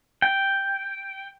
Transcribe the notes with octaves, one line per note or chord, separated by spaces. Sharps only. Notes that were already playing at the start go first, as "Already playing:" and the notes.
G5